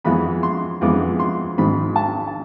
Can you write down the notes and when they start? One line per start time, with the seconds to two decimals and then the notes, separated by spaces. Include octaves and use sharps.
0.04 F2 E3 G#3 B3 B5
0.43 C6
0.81 F2 E3 G#3 B3 D6
1.19 C6
1.58 G#1 G#2 G#3 B5
1.96 A5
2.27 A5